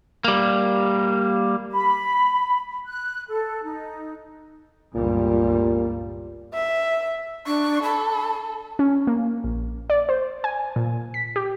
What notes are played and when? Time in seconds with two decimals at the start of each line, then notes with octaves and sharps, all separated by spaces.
0.24 G3 A#3
1.71 B5
2.87 F#6
3.28 A4
3.64 D#4
4.95 G1 C#2 A#2 G3
6.54 E5
7.47 D4 C#6
7.83 A4 B5
8.79 C#4
9.07 A#3
9.44 A#1
9.90 D5
10.09 C5
10.44 G#5
10.76 A#2
11.14 B6
11.36 G4